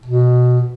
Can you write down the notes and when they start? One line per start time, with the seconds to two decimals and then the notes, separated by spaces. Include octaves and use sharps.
0.06 B2